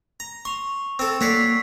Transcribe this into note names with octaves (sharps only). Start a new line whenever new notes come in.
A#5
C6 C#6 F7
C4 A4 E6
A#3 F#4 C#5 D5 E6 B6 C7